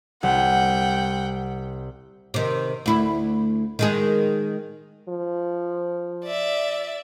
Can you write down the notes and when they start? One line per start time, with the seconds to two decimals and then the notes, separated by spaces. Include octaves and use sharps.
0.23 C2 F#5 G5
2.34 C3 D#3
2.86 D2 E4
3.79 D#3 G#3 G#4
5.09 F3
6.24 D5 E5